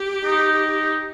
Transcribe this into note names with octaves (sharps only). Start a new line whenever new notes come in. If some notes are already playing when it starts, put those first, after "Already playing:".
Already playing: G4
D#4